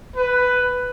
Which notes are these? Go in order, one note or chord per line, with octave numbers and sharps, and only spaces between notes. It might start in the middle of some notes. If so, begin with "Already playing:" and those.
B4